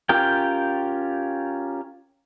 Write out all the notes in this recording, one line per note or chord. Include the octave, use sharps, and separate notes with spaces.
C#4 F4 G4 A#4 G5